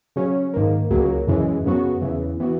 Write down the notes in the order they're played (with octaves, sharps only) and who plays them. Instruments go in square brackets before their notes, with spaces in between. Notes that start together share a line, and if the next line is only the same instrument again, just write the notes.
[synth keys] C#3 F#3 C#4
G#2 D#3 A#3
C#2 C#3 F#3 A#3
F#2 C#3 E3 G#3
F#2 C#3 F#3 B3 F#4
E2 C#3 E3
E3 B3 F#4